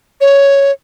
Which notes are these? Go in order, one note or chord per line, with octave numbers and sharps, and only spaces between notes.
C#5